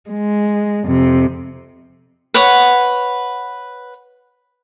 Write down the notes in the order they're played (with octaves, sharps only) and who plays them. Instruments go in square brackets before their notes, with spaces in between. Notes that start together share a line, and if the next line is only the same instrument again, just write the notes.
[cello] G#3
F2 C3
[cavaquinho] B4 C#5 F#5